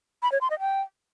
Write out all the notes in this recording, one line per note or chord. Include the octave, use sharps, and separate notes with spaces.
B5
C#5
C6
D#5
G5